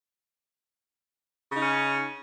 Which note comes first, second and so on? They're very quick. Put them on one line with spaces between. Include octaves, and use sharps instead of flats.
C#3 D#4 C#4